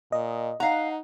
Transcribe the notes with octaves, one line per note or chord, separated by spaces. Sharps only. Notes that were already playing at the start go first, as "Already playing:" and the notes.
A#2 D#5
D#4 F5 F#5 A#5